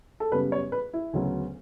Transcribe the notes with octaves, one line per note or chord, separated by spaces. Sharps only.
A4
F#2 C#3 G3 B3 B4
C#5
B4
E4
D2 C#3 F#3 B3